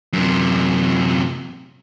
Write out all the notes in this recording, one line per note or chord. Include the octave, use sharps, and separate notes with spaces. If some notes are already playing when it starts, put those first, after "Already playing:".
F#2 C3